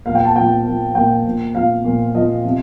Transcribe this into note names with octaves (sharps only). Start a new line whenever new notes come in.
A#2 F3 F5
G5
A5
A#2 F3 G5
A#2 F3
A#2 F3 G5
A#2 F3
A#2 F3 F5
A#2 F3
A#2 F3 D#5
C3 F3